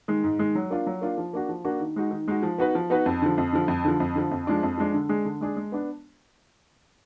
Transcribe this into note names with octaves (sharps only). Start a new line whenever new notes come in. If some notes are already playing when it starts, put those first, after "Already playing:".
D#3 G#3
G#2
D#3 G#3
F#3
A#3 D4 F4
F#3
A#3 D4 F4
F3
A#3 D4 F#4
F3
A#3 D4 F#4
D#3
G#3 D#4 F#4
D#3
G#3 D#4 F#4
F3
B3 D#4 F#4 B4
F3
B3 D#4 F#4 B4
F2
D3 F3
F2
D3 F3
F2
D3 F3
F2
D3 F3
F2
F3 G#3 D4
F2
F3 G#3 D4
D3
G#3 D4 G#4
D3
G#3 D4 G#4
G#3
B3 D4